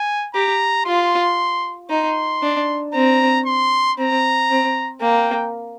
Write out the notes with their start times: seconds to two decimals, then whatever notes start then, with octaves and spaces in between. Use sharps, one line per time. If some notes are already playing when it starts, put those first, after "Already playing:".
Already playing: G#5
0.34 G4 A#5
0.85 F4 C6
1.90 D#4 C6
2.42 D4
2.94 C4 A#5
3.46 C6
3.98 C4 A#5
4.50 C4
5.01 A#3 G5